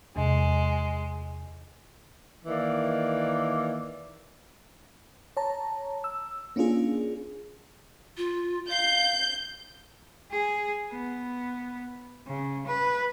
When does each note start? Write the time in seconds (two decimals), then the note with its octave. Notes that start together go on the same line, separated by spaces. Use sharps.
0.16 E2 C3 G#3
2.46 D#3 E3 A#3 D5
5.37 C#5 A5 A#5
6.04 E6
6.56 A#3 C#4 D4 F4 G#4
8.17 F4
8.69 F5 G6
10.31 G#4
10.92 B3
12.27 C#3
12.67 B4